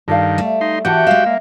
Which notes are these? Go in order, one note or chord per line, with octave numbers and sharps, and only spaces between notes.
G2 D#3 A4 D5 F5
G3 A3
D#4 C6
E2 E3 F#4 G4 F#5 G5 A5
G#3 E5 F5
A#3